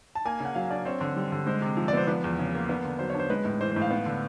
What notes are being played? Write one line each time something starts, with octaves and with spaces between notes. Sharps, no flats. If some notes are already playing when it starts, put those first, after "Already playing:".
A5
A#3 G#5
C#3 F#5
F#3 F5
D4 D5
C4 C#5
D3
G3
D3
G#3 C5
C3
F3
D5
B3 C5
F3 B4
E2
C#3
A#3
B3
D3
F#3 C5
C#5
D4 C5
G#3 B4
A2
E3 C5
C5
A2
F5
B3
D3